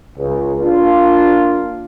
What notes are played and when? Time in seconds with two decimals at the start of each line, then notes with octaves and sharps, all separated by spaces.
0.18 C#2
0.60 A#3 D4 F4